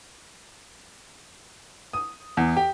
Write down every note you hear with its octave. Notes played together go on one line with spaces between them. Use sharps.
D#6
E2
G4